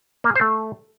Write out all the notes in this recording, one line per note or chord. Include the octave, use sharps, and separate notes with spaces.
A#3
G#4
C5
A3